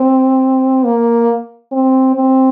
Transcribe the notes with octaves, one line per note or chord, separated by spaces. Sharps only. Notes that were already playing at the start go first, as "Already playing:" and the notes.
Already playing: C4
A#3
C4
C4